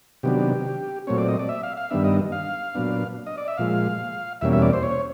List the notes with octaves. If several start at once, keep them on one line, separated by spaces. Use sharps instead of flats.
C3 D#3 F#3 B3 D4 G4
A#2 F#3 A3 C4 C#5
D5
D#5
D5
E5
F5
F5
G2 D#3 G3 B3 D4 E5
D#5
F5
A#2 F#3 B3 D4
D#5
D5
E5
A#2 F3 G#3 F5
E2 B2 G3 A#3 C#4 E5
E5
D5
C5
C#5